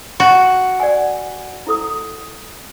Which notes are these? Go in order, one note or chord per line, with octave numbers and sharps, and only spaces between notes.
F#4
D5 F#5 G#5
E4 A4 D#6